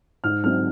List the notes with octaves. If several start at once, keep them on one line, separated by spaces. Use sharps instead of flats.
G#2 F6
F#3 C4 F6